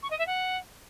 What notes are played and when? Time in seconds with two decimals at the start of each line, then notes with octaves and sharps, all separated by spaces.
0.02 C#6
0.10 D#5
0.18 E5
0.26 F#5